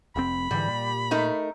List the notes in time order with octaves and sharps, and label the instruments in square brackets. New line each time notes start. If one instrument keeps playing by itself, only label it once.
[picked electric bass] F1 F2 C4 [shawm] B5
[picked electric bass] G#2 D3 E3 [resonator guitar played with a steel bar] G3
[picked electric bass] A#2
[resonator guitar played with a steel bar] A3 D#4 A#4